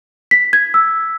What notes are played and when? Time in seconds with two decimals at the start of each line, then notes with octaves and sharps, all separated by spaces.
0.31 B6
0.53 G#6
0.74 E6